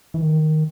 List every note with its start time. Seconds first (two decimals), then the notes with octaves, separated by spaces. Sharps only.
0.14 E3
0.22 D#3